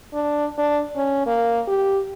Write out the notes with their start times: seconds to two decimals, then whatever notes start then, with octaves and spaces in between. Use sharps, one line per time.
0.14 D4
0.58 D4
0.96 C#4
1.27 A#3
1.68 G4